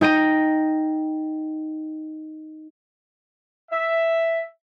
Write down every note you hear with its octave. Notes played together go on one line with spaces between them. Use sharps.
D#4 G5 A#6 D#7
E5